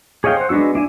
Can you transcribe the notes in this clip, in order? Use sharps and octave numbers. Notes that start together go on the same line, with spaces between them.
G#4 C#5 D#5 F5 G5
C5 F#5
G#3 B3 D4 F#4 E6
D4 E4 G#5